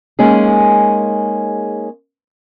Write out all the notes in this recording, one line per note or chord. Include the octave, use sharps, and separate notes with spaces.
G#3 A#3 C#4 D#4 G#4